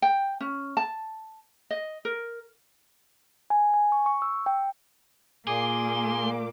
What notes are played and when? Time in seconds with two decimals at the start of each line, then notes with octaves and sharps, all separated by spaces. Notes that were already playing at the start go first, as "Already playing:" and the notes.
0.02 G5
0.41 C#4
0.77 A5
1.70 D#5
2.05 A#4
3.50 G#5
3.74 G#5
3.92 C#6
4.06 C#6
4.22 E6
4.46 G5
5.47 A#2 A#3 G#4 C6 D6